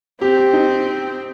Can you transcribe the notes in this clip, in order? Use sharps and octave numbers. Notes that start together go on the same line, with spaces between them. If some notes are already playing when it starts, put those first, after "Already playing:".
C4 G4
G4
D#4